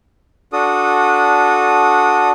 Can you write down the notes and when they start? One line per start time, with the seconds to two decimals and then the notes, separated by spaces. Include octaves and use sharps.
0.53 D4 F#4 A4 D#6